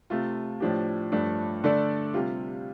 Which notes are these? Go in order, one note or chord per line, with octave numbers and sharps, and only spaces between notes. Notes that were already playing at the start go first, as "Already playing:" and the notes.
C3 A3 F4
A2 F3 D4 G4
G2 F3 A3 D4
D3 A3 D4 A4 D5
C3 G3 F4